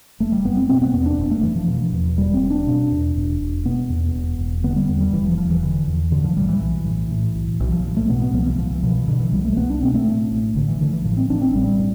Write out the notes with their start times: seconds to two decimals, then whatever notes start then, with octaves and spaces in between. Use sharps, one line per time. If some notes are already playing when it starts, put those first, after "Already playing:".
0.20 F1 A3
0.32 G3
0.45 F1 B3
0.57 C4
0.69 B2 C4
0.82 B3
0.93 E2 B3
1.06 D4
1.18 F1
1.31 A3
1.43 F1 E3
1.56 F3
1.68 B2
1.93 E2
2.17 E1 G3
2.34 C4
2.42 E1
2.50 D4
2.67 B2
2.92 E2
3.16 E1
3.40 E1
3.65 B2 B3
3.90 E2
4.15 E1
4.39 E1
4.64 D3 B3
4.76 G3
4.89 E2
5.01 G3
5.13 E1 E3
5.26 F3
5.38 E1 F3
5.50 E3
5.63 D3
5.87 E2
6.12 A2 D3
6.24 F3
6.37 B1 G3
6.49 E3
6.61 B1
6.86 A2
7.11 A2
7.35 B1
7.60 B1 E3
7.72 F3
7.84 A2
7.96 A3
8.09 B2 B3
8.22 B3
8.34 C2 F3
8.46 E3
8.58 C2 F3
8.71 E3
8.83 B2 F3
8.96 F3
9.08 B2 D3
9.20 E3
9.33 C2 G3
9.45 A3
9.57 C2 B3
9.70 D4
9.82 B2 C4
9.94 A3
10.06 A2
10.31 A1
10.56 A1 D3
10.68 E3
10.80 A2 D3
10.93 E3
11.05 A2 F3
11.17 C4
11.30 A1 D4
11.42 C4
11.54 A1 G3
11.79 A2